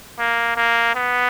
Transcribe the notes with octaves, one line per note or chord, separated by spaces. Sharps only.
A#3
A#3
B3